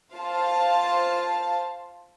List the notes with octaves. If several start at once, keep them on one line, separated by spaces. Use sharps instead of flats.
F4 C5 F5 A5